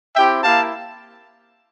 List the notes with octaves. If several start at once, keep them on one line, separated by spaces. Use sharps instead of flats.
C4 E4 G4 E5 G5
A#3 E4 G4 F5 A5